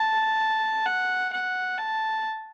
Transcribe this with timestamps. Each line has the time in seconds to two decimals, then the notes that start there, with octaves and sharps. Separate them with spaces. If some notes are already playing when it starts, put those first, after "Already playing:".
Already playing: A5
0.86 F#5
1.32 F#5
1.78 A5